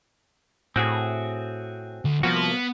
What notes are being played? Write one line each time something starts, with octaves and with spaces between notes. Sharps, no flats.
A2 C4 F#4 G#4
D2
C2 F3 A#3 B3 F#4